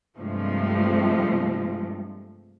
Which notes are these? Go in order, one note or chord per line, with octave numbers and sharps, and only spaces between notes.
G2 C3 F3 G#3 A3